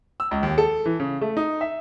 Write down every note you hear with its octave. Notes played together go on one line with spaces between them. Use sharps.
E6
C#2
D#2
A4
E3
C#3
A3
D#4
E5